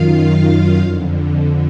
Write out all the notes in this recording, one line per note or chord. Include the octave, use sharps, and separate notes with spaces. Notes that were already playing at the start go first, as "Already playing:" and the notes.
Already playing: F#2 D#3 F4 F5
F2 D3